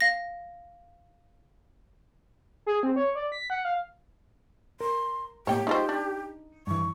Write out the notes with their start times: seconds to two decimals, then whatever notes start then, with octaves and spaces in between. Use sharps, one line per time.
0.01 F5 A#6
2.66 G#4
2.83 C4
2.96 C#5
3.15 D5
3.32 B6
3.50 F#5
3.65 F5
4.81 A#4 C6
5.47 A2 A#3 G4 C#5 G5
5.67 G#3 D#4 F4 C5 C6
5.89 D4
6.67 G2 E3 C#6